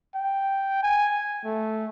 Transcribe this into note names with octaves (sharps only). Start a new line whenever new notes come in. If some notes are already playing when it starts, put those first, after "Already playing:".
G5
G#5
A3